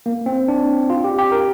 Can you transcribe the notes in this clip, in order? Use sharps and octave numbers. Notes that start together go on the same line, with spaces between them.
A#3
C4
D4
F4
G4
G4
A#4